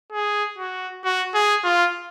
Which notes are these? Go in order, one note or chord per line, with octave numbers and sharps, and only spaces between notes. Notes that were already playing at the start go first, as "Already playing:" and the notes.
G#4
F#4
F#4
G#4
F4